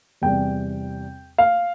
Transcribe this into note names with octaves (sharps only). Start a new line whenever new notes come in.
E2 C3 G3 G5
F5